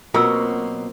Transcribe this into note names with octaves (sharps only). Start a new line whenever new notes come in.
B2 F#3 A#3 C4 F4 A#4 E6